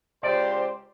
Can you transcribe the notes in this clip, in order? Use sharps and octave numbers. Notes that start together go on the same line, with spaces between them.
C#2 G4 C5 D5